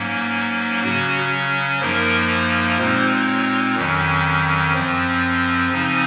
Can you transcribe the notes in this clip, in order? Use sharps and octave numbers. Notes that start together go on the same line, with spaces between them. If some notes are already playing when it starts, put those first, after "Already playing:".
Already playing: G#2 F#3 A#3 C#4
C#3 F#3 C#4 F#4
F#2 F3 A#3 D#4 A#4
C5
A#2 G#3 C4 D#4 C5
C#5
F2 D#3 F#3 C#4
F#2 F3 C4
C#3 F3 C4 D#4 G#5